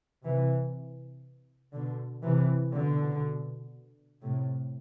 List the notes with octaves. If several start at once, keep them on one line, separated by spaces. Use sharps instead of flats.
C3 E3
B2 D3
C3 E3
B2 D3
A2 C3